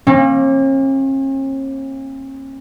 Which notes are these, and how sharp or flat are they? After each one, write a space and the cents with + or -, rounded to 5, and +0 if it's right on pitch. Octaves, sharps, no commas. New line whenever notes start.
A#3 +0 C#4 -45